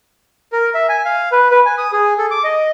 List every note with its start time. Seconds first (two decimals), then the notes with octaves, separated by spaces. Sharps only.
0.52 A#4
0.74 E5
0.89 G#5
1.05 F5
1.32 B4
1.51 B4
1.66 G#5
1.78 D#6
1.92 G#4
2.18 A4
2.31 D6
2.44 D#5